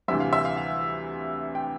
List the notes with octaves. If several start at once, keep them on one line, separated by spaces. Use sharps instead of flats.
D2 C3 E3 G3 E5
F5
E5
F5
F5
G5